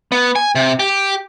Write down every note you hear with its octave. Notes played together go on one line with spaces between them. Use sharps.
B3
G#5
C3
G4